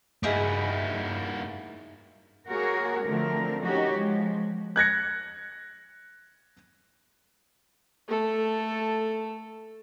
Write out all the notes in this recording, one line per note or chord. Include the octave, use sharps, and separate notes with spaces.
G2 A#3 D#4 E4 F#4 G#4
A#3 F#4 G#4 A#4 C#5
D3 F3 A3 C4 A#4
C#4 D#4 F#4 G4 C#5
F3 G#3
F#6 G#6 A#6 C#7
A3 A4